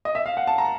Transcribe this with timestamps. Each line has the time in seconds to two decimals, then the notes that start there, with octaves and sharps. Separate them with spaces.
0.05 D#5
0.15 E5
0.26 F5
0.37 F#5
0.47 A5
0.58 A#5